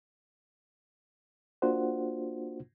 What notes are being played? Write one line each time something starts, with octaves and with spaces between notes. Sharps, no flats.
A#3 D4 F4 F#4 C5 F#5